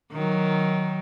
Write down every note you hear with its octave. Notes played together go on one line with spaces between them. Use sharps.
D#3 F#3